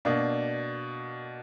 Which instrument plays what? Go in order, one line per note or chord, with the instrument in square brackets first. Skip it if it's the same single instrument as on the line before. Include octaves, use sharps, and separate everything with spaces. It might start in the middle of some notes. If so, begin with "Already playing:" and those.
[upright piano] B2 A#3 D4